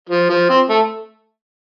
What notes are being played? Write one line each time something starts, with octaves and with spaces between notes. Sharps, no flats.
F3
F3
C4
A3